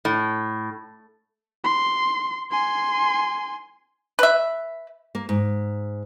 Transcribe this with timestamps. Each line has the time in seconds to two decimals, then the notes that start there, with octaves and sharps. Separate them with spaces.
0.05 A2
1.64 C6
2.52 G#5 C6
4.19 B4 E5
5.15 A#3
5.29 G#2